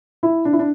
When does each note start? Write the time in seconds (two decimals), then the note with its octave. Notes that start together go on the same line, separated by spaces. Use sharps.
0.23 E4
0.45 D4
0.53 E4
0.59 D4